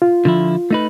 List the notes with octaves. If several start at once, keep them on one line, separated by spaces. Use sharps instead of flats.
F4
D3 F3 E4
A3 D#4 B4